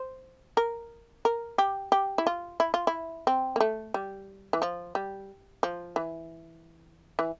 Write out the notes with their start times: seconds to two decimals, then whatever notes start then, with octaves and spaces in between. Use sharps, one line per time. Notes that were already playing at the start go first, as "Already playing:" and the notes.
Already playing: C5
0.57 A#4
1.25 A#4
1.58 G4
1.92 G4
2.18 E4
2.27 F4
2.60 E4
2.74 F4
2.87 E4
3.27 C4
3.56 A#3
3.60 A3
3.94 G3
4.53 E3
4.62 F3
4.95 G3
5.63 F3
5.96 E3
7.19 E3